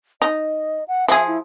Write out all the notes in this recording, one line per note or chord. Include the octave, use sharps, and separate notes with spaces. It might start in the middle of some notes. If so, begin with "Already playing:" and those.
D#4 D#5
F#5
F3 G#4 E5
E4